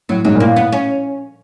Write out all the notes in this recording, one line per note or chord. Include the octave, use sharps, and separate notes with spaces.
A2 F#3
G#2 F#3
A#2
A2 A#3
A2 B3
C#4